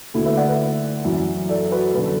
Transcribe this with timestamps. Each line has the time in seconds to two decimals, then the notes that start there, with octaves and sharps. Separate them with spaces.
0.14 D2 D3 E4 A4
0.25 B4 E5
0.37 D5 F#5
0.48 B4 E5
1.04 F#2 E3
1.49 A4 D5
1.71 F#4 B4
1.94 F#2 D3 B4
2.04 A4